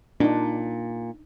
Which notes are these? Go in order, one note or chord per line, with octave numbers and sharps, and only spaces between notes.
A#2 D4 D#4